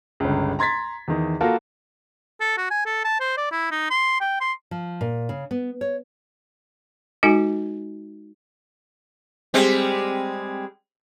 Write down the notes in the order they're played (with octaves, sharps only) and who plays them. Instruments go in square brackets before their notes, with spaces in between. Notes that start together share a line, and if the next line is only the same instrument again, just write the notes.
[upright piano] G1 C#2
A#5 C6 G#6 A6 B6
E2 D#3
A#3 F4 F#4 A4 A#4
[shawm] A4
F#4
G#5
A4
A5
C5
D5
E4
D#4
C6
G5
C6
[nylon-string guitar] F3
A#2
C#3
B3
C#5
[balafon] G#3 D#4 F#4 A4 G#5
[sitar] G3 G#3 C4